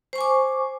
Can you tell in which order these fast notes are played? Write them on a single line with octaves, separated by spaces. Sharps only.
C5 C#6 G#5 D6